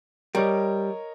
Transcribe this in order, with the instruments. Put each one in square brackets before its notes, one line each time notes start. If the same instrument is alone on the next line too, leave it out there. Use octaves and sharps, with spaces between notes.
[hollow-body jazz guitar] G3 [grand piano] A#4 C#5 D#5